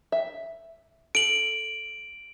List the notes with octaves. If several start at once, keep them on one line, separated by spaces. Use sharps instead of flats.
E5
A4 D7 F#7